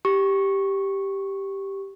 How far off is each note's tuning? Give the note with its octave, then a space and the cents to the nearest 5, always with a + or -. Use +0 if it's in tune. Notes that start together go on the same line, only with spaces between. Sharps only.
G4 +0 C#6 -10